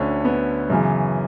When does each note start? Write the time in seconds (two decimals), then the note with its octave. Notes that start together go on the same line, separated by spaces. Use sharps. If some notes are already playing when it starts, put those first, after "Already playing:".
Already playing: D2 D3 C#4
0.25 B3
0.70 F#2 C#3 E3